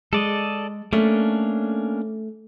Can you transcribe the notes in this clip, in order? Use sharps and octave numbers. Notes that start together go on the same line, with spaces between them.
G#3 A4 D5 D#5
A3 A#3 C#4 D4